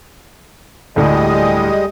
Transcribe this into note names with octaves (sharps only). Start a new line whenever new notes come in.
D2 A2 G3 G#3 D#5